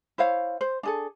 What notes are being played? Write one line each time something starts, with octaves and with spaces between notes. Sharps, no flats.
E4 C5 C#5 F5
C5
D4 G#4 A4